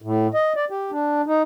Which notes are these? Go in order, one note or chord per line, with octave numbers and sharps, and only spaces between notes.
A2
D#5
D5
G4
D4
D#4